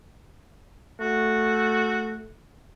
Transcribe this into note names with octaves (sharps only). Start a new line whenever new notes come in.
A3 F#4